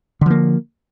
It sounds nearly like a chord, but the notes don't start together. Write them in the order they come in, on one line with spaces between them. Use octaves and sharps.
D3 F3 A#3